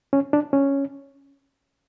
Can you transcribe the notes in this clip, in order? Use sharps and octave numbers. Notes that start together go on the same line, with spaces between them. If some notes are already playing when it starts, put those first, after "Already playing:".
C#4
D4
C#4